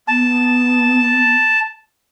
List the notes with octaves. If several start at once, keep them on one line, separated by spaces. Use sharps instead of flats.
B3 A5